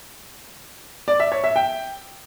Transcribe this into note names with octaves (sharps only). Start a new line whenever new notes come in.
D5
E5
C#5
E5
G5